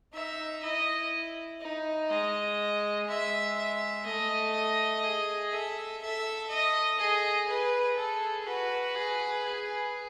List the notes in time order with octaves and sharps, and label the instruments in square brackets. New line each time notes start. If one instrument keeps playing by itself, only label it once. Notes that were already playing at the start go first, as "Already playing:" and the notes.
[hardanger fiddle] D#4 [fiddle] E5
[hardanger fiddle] E4 [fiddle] D#5
[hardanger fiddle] D#4
[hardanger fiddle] G#3 [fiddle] D#5
[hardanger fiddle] G#3 [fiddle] E5
[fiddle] E5
[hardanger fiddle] A3 [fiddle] D#5
[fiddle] D#5
[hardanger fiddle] G#4
[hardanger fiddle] A4 [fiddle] E5
[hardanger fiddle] A4 [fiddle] E5
[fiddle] D#5
[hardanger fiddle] G#4 [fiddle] D#5
[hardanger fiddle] G#4 [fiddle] B4
[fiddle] A4
[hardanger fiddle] F#4 [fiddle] B4
[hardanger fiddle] G#4
G#4